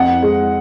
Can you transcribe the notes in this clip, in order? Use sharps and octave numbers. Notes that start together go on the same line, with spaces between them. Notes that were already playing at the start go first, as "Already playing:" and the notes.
Already playing: F2 F#5
G#3